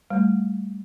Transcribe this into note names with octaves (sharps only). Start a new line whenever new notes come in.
G3 A3